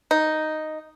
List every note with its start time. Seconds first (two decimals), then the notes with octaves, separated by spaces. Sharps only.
0.11 D#4